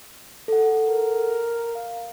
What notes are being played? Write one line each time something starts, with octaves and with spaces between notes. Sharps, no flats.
A4 F#5
A#4
F5